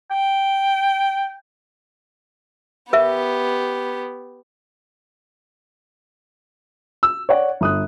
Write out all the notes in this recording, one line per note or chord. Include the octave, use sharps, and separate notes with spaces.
G5
B3 G4 A#4 E5
E6
C#5 D5 F#5
G1 D#6 F#6